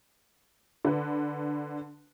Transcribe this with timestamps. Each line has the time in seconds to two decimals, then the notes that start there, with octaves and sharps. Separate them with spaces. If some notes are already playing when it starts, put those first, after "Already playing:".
0.85 D3 B4